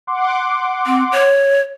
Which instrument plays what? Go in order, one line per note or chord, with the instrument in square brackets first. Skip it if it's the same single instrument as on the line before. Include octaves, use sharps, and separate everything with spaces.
[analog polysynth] F#5 C6 D6
[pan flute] C4
C#5